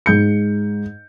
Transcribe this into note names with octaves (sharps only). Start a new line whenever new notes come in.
G#2 G6 C#7